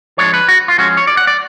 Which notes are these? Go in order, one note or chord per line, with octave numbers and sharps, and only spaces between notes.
F3 G#3 D4 C#5
B4
F#4
F4
F3 G#3 C#4 F#4
C#5
D5
F#5
D5